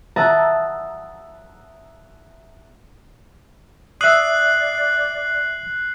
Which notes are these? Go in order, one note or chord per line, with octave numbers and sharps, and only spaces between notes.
E5 F#5 A5 A#5 D#6 E6
D5 E5 D#6 F#6 C7 F#7